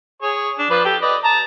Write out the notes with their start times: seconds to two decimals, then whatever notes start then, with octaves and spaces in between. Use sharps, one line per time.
0.22 G#4 C#5
0.58 D4
0.70 F3 B4 D5
0.85 G4 A4
1.02 B4 D5 D#5
1.24 A5 A#5